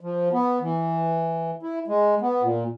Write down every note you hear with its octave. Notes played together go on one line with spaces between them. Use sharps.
F3
B3
E3
E4
G#3
B3
A#2